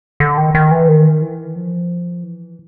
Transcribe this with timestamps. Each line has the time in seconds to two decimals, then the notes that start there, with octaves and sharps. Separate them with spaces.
0.20 D3
0.38 D#3
0.55 D#3
0.71 E3
0.88 D#3
1.22 E3
1.56 F3
2.24 E3